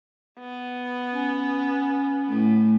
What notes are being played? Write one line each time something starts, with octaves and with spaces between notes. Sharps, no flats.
B3
C#4
A2 A3